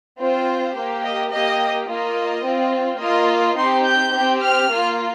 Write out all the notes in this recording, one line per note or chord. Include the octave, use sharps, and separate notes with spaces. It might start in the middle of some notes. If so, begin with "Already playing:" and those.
C4 F4 C5
A#3 G4
D#5
A#3 G4 D#5
A#3 F4 D#5
C4 F4
A#3 F4 D#5
C4 D#4 G4 C6
G6
C4 G4
F6
A#3 F4